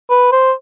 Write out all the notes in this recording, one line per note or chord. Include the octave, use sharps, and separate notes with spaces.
B4
C5